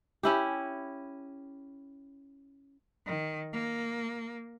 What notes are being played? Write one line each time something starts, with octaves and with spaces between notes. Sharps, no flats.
C#4 E4 G4
D#3
A#3